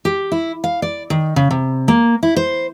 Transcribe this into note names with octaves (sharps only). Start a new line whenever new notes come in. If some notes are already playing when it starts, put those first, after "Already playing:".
G4
E4
F5
D5
D#3
C#3
C3
A#3
E4
C5